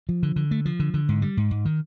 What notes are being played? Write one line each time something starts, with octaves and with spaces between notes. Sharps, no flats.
F3
D3
D3
A3
F3
D3
D3
G#2
G3
G#2
G#2
D#3